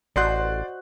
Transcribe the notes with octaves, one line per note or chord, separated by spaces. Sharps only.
A1 F#4 C5 D5 D#5 C6 F#6